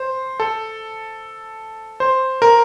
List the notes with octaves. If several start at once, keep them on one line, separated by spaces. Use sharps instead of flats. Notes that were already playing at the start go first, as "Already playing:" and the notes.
Already playing: C5
A4
C5
A#4